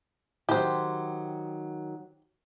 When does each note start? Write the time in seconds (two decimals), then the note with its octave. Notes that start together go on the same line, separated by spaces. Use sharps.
0.49 D#3 F#3 G4 C5